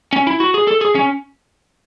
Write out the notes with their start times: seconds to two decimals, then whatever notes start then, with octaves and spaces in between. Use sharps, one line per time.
0.13 C#4
0.27 E4
0.40 F#4
0.54 G#4
0.67 A4
0.81 G#4
0.95 C#4